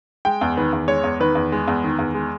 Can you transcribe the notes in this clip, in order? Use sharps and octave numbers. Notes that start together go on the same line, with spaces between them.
G#3 G5
E2
D#3 B4
E2
G#3 C#5
E2
D#3 B4
E2
G#3
E2
D#3
E2
G#3